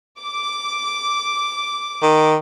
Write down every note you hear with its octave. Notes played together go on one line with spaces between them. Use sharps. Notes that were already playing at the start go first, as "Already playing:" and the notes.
D6
D#3